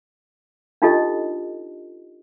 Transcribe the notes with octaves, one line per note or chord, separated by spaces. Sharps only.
D4 D#4 F4 G4 A4 D#5